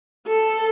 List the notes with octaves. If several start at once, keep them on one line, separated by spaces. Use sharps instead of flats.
A4